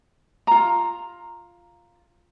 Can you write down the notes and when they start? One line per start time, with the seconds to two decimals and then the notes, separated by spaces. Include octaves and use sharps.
0.47 F4 A#5